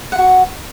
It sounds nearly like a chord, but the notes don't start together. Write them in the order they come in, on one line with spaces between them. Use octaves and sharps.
F#5 F4 F#4